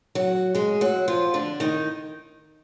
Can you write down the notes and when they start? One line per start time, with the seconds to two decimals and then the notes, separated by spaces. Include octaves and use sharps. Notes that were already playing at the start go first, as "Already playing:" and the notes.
0.15 F#3 F#4
0.55 G#3 G#4
0.81 F#3 F#4
1.08 F3 F4
1.34 D3 D4
1.60 D#3 D#4